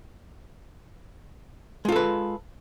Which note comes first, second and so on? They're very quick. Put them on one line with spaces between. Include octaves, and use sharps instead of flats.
G#3 F4 A4 B4